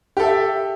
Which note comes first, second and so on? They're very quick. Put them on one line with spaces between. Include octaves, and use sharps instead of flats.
G4 A4 E5